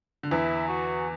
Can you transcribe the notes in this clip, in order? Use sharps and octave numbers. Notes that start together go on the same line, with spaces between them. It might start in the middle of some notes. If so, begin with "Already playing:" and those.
D3
E2 E3 E4
F#4